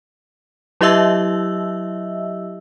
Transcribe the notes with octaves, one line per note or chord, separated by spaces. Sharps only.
F#3 E4 G4 D#5 E5 E6